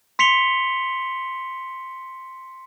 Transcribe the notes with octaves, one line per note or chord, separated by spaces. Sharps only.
C6 B6 C#7 F7 G7